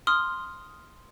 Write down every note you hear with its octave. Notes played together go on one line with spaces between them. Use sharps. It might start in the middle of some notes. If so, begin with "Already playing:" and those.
C6 D#6 F6